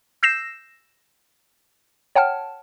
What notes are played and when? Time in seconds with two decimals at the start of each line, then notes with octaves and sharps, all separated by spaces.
0.23 E6 G6 A#6 C7 E7
2.15 C#5 F#5 G5 A5 F6